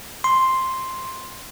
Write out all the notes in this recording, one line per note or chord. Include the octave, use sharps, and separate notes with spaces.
C6